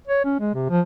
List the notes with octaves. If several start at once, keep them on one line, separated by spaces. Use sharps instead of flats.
C#5
C#4
G#3
C3
F3